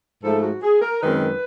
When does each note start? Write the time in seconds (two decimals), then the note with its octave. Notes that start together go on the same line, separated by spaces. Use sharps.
0.23 G#2 F3 A3 A4
0.43 F#4
0.63 G#4
0.82 A#4
1.02 F#2 D#3 G#3 C4 B4